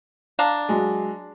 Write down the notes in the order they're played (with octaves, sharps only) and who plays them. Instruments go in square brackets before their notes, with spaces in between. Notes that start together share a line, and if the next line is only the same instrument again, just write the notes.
[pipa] D4 F5 A#5
[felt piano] F#3 G#3